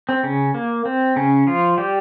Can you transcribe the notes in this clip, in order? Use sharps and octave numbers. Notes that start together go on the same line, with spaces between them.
C4
C#3 C#4
A#3
C4
C#3 C#4
F3 F4
G3 G4